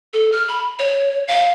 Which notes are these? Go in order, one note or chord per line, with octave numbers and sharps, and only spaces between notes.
A4
F6
B5
C#5
F5